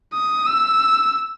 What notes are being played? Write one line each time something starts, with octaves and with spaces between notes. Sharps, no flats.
D#6
E6